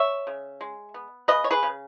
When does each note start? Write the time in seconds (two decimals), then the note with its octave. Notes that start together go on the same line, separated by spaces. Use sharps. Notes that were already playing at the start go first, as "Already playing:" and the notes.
Already playing: C#5 E5
0.27 C#3
0.61 G#3
0.94 B3
1.28 C#3 B4 D#5
1.44 C#5
1.51 G#4 B4
1.63 C#3